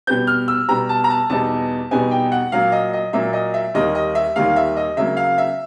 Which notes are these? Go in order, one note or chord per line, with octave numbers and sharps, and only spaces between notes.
B2 G3 B3 G6
F6
E6
B2 G3 B3 A#5
A5
A#5
A5
E2 B2 G3 B3 D#4 A5
E2 B2 G3 B3 D#4 G#5
G5
F#5
A#2 F#3 A#3 F5
D#5
D#5
A#2 F#3 A#3 E5
D#5
E5
D#2 D#3 G3 A#3 D#5
D#5
E5
D#2 D#3 G3 A#3 F5
E5
D#5
C#3 F#3 A#3 E5
F5
E5